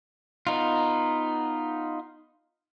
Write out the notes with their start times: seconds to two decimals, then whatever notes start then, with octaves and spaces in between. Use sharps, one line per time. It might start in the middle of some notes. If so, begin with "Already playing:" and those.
0.47 B3 D#4 F4